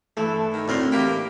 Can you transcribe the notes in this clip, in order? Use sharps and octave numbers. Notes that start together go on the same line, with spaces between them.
G2 E3 A3 A4
D#3
D2 A2 C4 A#4 C6
E3 A#3 G4 G5 B5